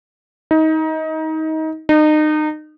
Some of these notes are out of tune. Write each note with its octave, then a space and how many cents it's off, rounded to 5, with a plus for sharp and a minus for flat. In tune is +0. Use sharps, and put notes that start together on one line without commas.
D#4 +25
D#4 -30